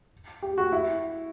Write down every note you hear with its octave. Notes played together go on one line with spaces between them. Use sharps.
G4
F#4
E4